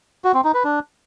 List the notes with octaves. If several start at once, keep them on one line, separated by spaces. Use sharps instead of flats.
F#4
C4
D#4
B4
D4